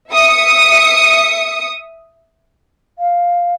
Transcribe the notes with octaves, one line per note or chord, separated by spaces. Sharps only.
E5 D#6 C#7
F5